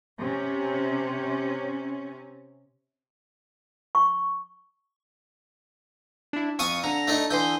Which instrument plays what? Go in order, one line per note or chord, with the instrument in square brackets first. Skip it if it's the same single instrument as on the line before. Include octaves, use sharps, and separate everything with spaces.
[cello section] C3 C#4
[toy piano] C#6
[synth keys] D4 E4
[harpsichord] F2 F5 D#6 [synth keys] C#6 D#7
[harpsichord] D3 [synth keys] A#5
[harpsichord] A3 D4 D#4
[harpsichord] D3 E3 [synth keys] C6 D#6 G6